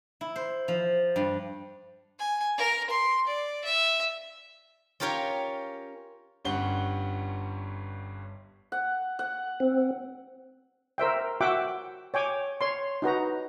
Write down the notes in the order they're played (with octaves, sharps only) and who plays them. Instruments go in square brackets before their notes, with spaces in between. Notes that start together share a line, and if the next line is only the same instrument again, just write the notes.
[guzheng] E4
C5
F3
G2
[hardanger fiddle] G#5
A#4
C6
D5
E5
[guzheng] C#4 F4 G4 A#4 C#5 G5
[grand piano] G1 G2 C#4 F#5 G7
[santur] F#5
F#5
[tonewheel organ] C4
[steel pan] A#4 C5 E5 G5
F#4 E5 F#5 G5 D6
C#5 G5 G#5 D6
C#5 C6
D#4 F#4 B4 A#5